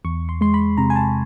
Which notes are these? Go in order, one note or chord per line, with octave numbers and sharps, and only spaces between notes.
E2 C#6
C6
G#3 C6
B5
C3 A#5
G#5
A5